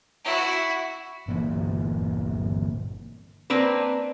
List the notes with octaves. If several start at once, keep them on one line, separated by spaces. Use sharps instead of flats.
E4 F#4
G1 A#2 E3 A#3
A#3 C4 D4 B4